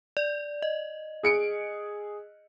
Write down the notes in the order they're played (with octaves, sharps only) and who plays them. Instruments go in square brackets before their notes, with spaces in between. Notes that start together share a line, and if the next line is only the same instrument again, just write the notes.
[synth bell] D5
D#5
[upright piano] G#4 C#7 D7